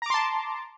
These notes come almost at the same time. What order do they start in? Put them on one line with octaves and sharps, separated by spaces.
A#5 D6 C6 A5